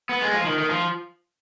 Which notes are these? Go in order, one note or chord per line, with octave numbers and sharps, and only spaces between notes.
B3
G#3
F3
D#3
D#3
F3